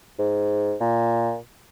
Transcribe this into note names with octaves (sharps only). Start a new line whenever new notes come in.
G#2
A#2